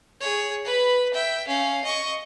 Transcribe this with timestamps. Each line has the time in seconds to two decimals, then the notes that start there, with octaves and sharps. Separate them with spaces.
0.20 G#4 C#5
0.65 B4 B5
1.13 E5 G5
1.47 C#4 F5
1.84 D#5 C#6